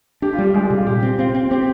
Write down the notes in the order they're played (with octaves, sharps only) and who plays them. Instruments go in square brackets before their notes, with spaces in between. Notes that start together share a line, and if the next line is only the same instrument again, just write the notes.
[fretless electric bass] D4 [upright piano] G4
[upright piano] F4
[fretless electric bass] G3
[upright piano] G4
[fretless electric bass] G3 [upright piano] G#3 G#4
[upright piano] G4
[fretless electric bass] C3
[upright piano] F4
[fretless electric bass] A#2 [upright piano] G4
[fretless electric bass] C4
[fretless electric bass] C4 [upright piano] F4
[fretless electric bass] C4
[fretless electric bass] C4 [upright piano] G4